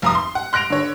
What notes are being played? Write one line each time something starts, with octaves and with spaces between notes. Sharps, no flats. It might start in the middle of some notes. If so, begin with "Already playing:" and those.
F1 A#5 D#6
C6
F#5
C6 F#6 A#6 D7 F7
D3 C#5